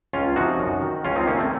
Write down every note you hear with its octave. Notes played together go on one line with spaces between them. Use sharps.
C#2 C#4 F4
C3 F3 D#4 F#4
F#2
D#3
C#2 C#4 F4
C4 D#4
C3 D#3 A#3 C#4
A3 C4